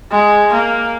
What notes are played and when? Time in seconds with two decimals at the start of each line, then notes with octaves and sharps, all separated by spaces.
0.11 G#3
0.53 A#3